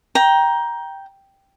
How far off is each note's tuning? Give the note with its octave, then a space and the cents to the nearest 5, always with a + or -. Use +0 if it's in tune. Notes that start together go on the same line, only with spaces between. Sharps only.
G5 +0 A#5 +15